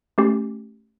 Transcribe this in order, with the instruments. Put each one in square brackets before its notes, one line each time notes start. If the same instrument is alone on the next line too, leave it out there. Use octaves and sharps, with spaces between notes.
[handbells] A3 C#4 G4